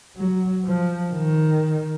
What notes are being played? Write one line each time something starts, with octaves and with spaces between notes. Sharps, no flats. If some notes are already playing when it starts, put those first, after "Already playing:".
F#3
F3
D#3